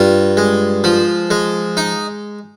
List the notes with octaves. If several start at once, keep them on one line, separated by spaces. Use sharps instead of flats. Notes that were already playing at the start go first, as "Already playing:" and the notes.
Already playing: G2 F4
G#3
F3
G#3
D#4